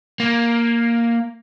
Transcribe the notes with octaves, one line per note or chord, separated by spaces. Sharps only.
A#3